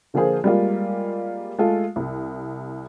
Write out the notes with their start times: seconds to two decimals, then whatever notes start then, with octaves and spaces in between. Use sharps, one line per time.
0.14 D3 F3 A#3 F4 G#4 C5
0.44 G3 G#3 A#3 F4
1.59 G#3 A3 F4 A4
1.96 C2